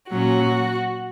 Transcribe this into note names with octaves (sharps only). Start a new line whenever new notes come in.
A#2 F#3 C#4 F#4